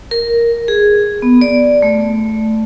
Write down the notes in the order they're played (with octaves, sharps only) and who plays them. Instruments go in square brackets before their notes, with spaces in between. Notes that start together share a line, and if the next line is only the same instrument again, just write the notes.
[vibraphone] A#4
G#4
B3
D5
A3